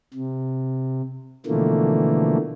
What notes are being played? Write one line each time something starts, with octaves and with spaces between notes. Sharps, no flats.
C3
B2 D3 E3 F3 A3 A#3